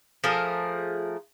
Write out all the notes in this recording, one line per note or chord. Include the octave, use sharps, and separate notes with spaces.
F3 A3 G#4 A#4